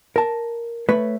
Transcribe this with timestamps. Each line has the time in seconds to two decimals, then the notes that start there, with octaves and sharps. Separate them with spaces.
0.16 A#4 A5
0.89 A3 B4 C#5